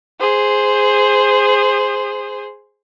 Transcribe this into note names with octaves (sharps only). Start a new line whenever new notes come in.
G#4 C5